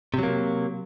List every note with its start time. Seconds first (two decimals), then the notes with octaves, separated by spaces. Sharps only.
0.14 C3
0.18 F#3
0.23 A#3